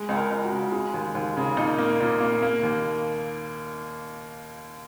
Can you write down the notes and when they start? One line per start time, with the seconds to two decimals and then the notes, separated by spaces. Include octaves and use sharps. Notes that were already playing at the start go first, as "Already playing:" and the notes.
Already playing: G#3
0.09 C#2
0.17 A#4
0.30 C#2
0.45 F#4
0.52 C#3
0.72 G#3
0.94 D#2
1.15 D#2
1.37 C#3
1.57 A#2 D#4
1.78 A#3
2.00 A#2
2.20 A#3
2.42 A#3
2.63 D#2